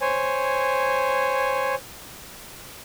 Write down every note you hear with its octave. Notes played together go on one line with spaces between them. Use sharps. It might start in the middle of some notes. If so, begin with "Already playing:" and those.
C5 C#5 G#5